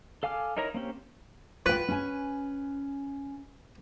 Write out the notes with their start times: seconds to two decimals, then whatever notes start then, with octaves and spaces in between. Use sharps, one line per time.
0.23 A4 F5 G#5 D6 F6
0.57 D#4 E4 A#4 C#5 A#5
0.74 A#3 C4 C#4 G4
1.66 F4 B4 G5
1.88 C#4 G#5